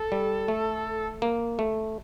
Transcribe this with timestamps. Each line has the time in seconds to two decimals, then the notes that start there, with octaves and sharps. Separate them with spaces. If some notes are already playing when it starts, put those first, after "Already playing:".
Already playing: A4
0.12 G3
0.48 A3
1.22 A#3
1.59 A3